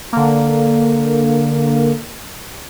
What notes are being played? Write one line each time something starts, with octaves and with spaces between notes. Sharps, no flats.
D3 A#3